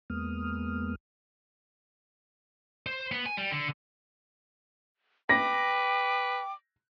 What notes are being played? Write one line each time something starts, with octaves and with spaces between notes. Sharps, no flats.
E2 G#3 A#3 B3 D#6 F6
C5
B3
G#5
G3
D3
B4 G5 D6 A#6